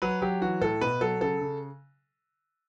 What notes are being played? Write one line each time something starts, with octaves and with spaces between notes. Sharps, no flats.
F#3 B4
F#3 G4
E3 F#4
A2 A4
B2 B4
F#3 A4
C#3 A4
C#3